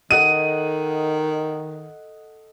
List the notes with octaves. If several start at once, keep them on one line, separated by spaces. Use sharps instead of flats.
D#3 A4 D#5 F#5 D#7